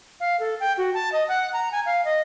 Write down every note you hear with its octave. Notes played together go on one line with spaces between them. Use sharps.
F5
A4
G5
F#4
A5
D#5
F#5
A#5
G#5
F5
D#5